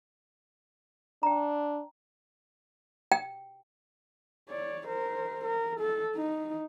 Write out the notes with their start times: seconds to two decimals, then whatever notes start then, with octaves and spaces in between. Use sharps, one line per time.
1.23 D4 G5 A#5
3.12 G5
4.49 C#5 D5
4.87 A#4 C5
5.44 A#4
5.80 A4
6.16 D#4